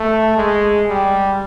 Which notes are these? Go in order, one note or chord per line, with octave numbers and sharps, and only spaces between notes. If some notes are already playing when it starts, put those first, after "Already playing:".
Already playing: A3
G#3
G3